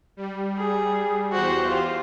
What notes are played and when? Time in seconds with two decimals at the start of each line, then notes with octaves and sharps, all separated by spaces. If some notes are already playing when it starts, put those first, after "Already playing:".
0.17 G3
0.57 G#4
1.32 E2 F#4 G4 C5
1.65 F4